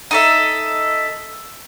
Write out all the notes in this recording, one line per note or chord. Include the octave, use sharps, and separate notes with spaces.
D#4 A4 E5